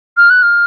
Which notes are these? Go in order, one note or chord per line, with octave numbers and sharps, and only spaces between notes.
F6
F#6
F6